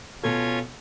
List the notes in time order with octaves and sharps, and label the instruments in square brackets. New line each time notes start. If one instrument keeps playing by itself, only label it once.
[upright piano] B2 A4 [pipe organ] C#4 F4 G#6